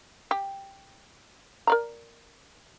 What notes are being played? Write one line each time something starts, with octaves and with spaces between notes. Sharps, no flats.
G4
A#4 D5 A#5